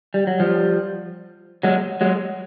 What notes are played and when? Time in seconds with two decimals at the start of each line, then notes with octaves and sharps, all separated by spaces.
0.14 G3
0.27 F#3
0.40 F3 G3
1.63 F#3 G#3
2.01 F#3 G#3